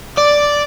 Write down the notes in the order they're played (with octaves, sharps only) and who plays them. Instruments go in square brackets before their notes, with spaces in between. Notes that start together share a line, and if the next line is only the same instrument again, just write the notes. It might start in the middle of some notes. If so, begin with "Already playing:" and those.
[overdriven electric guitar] D5